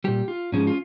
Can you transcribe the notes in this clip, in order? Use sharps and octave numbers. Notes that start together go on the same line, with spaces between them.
A#2 G3 G4
F4
G#2 F3 G#3 C#4
F4